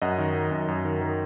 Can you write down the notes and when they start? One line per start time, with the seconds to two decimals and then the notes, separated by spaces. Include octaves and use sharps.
0.02 F#2 D#5 F#5
0.18 D#3
0.35 D#3
0.51 F#2
0.68 F#2
0.85 D#3
1.01 D#3